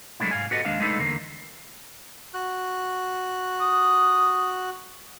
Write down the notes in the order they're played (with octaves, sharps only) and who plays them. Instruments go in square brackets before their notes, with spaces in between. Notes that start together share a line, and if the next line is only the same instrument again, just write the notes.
[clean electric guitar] F#3 G#3 A3 D4 E4
G#2 F5 G#5
F#4 G4 A4 B4 D#5
D#2 G#3 D4 F5
G#3 A3 D4 D#4 A4 B4
E2 D3 A#3
[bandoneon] F#4 F#6
[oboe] D#6